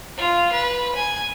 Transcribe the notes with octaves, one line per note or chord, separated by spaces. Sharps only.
F4
B4
G#5